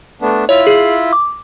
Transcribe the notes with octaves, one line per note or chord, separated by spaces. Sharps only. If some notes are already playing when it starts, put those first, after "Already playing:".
A3 B3 D4
E4 F4 C#5
G#4
D6